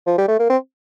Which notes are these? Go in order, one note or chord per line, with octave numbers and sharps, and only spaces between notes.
F3
G3
A3
A#3
C4